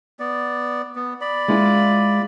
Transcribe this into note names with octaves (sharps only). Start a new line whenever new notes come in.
B3 D5
B3
D5 B5
G#3 E4 F4